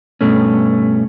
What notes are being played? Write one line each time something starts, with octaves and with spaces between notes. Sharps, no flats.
G2 B2 A3 C#4